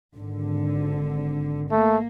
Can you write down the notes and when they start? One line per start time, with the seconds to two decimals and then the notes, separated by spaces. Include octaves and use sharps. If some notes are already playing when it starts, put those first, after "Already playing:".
0.15 G#1 D3
1.71 A3 A#3